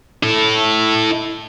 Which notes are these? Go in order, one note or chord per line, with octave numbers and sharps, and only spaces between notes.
E4 A4